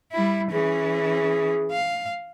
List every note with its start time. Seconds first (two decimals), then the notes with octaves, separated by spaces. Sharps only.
0.12 G3 E4
0.51 E3 C#4 G#4
1.71 F5